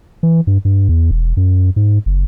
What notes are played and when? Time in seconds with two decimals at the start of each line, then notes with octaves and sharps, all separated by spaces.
0.23 E3
0.47 G2
0.65 G2
0.89 E2
1.11 E1
1.37 F#2
1.76 G#2
2.06 F#1